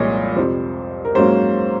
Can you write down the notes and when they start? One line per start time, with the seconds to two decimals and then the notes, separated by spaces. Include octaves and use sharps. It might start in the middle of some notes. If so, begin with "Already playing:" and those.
Already playing: C2 A#2 F3 G#3 C#5 D#5
0.36 F2 C3 F3 C5
1.05 A#4
1.15 G#2 F#3 A#3 C#4 C5